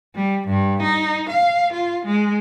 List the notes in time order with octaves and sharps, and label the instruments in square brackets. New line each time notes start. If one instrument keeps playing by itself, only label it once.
[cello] G3
G2
D#4
F5
F4
G#3